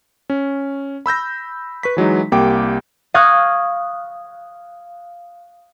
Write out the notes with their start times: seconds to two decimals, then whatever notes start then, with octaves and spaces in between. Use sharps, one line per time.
0.30 C#4
1.06 B5 E6 G6 A#6
1.83 B4 C#6 B6
1.97 E3 F#3 G#3 D#4
2.32 C2 A#3 G4 G5 D6
3.14 F5 C#6 D#6 F#6 G#6 A#6